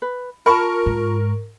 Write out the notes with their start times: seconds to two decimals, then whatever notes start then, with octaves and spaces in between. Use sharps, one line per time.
0.02 B4
0.46 F4 A#4 A5 B5 C#6
0.86 G#2